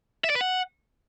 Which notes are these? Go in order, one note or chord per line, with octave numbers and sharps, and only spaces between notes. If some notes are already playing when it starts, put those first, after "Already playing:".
E5
D5
B4
F#5